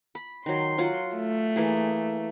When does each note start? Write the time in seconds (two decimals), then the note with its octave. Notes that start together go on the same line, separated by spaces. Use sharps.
0.15 B5
0.46 D#3 F#3 C6
0.78 F#3 F4 F#5
1.17 A3
1.56 E3 A#3 G#4